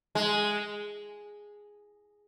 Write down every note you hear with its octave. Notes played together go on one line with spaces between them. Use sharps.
G#3